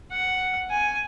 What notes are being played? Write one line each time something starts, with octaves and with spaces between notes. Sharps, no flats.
F#5
G#5